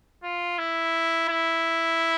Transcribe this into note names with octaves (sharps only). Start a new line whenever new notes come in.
F4
E4
E4